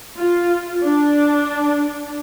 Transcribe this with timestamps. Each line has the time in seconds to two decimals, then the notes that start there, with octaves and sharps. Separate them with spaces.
0.16 F4
0.82 D4